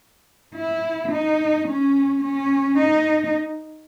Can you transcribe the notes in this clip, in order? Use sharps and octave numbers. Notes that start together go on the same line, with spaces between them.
E4
D#4
C#4
C#4
D#4